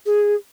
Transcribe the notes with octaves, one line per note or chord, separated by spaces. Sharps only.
G#4